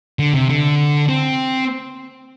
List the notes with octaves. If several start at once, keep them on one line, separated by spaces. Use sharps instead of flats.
D3
C3
D3
C4